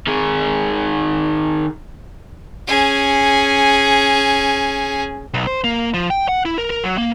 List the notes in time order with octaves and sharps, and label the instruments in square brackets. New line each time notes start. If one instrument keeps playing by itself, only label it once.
[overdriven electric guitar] D#3 G#4
[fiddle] C#4 G#4
[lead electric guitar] B1
C5
A#3
F3
G5
F#5
E4
A#4
A#4
F#3
A#3